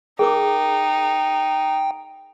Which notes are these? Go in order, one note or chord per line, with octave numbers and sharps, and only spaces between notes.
D#4 G#4 A#4 G5 D6